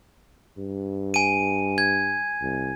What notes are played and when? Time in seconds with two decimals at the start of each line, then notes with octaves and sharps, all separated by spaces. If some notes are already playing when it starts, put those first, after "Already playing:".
0.58 G2
1.14 G#5 D#7
1.78 G#6
2.41 C2